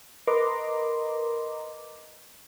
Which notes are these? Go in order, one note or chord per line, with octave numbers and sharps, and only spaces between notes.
A#4 B4 D#5 A#5 C6 D6